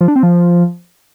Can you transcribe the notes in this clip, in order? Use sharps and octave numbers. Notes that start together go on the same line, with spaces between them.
F3
D4
C4
F3